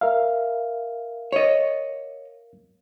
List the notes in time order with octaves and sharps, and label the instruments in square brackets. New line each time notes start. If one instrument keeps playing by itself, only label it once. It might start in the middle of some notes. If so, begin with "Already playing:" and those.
[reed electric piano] A#4 E5 F5
[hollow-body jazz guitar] C#5 D#5